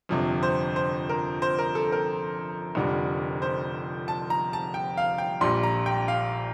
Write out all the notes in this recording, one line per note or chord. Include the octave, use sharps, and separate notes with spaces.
G1 F2 C3
C5
C5
A#4
C5
A#4
A4
A#4
F1 F2 D3 G3
C5
A5
A#5
A5
G5
F5
G5
A#1 A#2 G3 C6
A#5
G5
F5